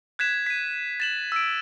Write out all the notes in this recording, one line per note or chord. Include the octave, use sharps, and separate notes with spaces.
F#6 G#6 B6 E7
B6 D#7
A6 E7 F#7
E6 D7